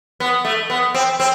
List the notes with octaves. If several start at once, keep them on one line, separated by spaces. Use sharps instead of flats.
B3
A3
B3
C4
C4